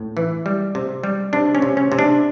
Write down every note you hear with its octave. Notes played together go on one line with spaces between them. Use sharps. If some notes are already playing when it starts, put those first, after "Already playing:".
Already playing: A2
E3
G3
C3
G3
C3 D4
C#4
C3
C#4
C3
D4